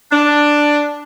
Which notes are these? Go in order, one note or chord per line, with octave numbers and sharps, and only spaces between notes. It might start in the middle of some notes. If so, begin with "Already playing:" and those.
D4